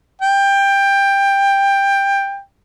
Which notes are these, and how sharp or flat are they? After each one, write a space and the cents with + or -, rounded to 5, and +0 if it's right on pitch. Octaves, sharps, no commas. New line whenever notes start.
G5 +15